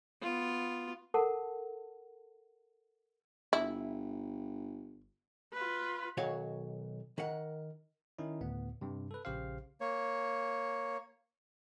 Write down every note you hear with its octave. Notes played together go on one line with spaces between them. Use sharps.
B3 F4
A4 A#4 F#5 A5
G1 E4
F4 B4
B1 D#3 F#4 C#5 F5 F#5
D#3 A#4 F#5
D#3 C#4 D#4 E4
D2 A2 B3
G2 C3
A4 B4
A#1 C#3 G4 C5 F5
A#3 C#5